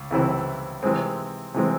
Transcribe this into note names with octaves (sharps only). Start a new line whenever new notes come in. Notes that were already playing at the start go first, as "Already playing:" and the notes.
Already playing: C#2
C#2 C3 E3 C4 E4
C3 E3 G#3 C4
C3 E3 G#3 C4